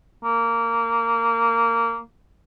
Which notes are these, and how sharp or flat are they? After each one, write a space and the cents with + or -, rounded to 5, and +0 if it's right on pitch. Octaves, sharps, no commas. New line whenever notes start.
A#3 -15